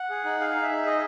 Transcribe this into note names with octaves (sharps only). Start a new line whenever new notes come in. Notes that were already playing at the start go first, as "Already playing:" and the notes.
Already playing: F#5
G#4
D#4
G#4 F5
D#4
E5
D#4
G#4 D#5